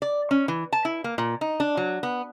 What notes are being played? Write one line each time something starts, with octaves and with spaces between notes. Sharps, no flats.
D5
C#4
E3
A5
E4
A#3
A#2
D#4
D4
F#3
B3